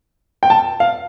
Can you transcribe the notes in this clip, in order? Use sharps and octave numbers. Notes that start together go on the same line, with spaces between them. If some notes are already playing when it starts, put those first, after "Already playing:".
G5
A5
F5